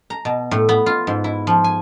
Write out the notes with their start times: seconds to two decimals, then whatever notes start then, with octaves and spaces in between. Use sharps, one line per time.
0.10 A#5
0.25 B2
0.51 A2
0.69 B3
0.86 F4
1.07 G#2
1.24 E4
1.47 F3
1.64 G#5